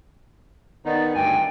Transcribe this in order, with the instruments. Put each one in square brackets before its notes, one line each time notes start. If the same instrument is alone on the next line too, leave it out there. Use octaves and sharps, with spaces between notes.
[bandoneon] D#3 B3 D#4 [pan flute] D5
[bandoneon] D2 G2 G#5 [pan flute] G5